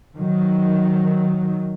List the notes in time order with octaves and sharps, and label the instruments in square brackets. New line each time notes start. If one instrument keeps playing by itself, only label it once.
[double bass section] D#3 F#3